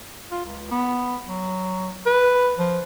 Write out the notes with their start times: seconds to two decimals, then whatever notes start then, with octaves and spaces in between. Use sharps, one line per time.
0.31 F4
0.45 C#2
0.71 B3
1.27 F#3
2.06 B4
2.58 F3